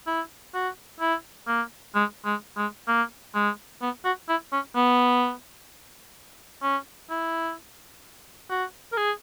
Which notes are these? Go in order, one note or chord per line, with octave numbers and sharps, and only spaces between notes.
E4
F#4
E4
A#3
G#3
G#3
G#3
A#3
G#3
B3
F#4
E4
C#4
B3
C#4
E4
F#4
A#4
G#4